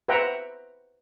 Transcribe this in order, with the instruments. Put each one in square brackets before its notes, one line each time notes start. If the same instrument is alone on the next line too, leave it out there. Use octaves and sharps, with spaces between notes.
[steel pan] B4 C5 E5 F#5 G5 A#5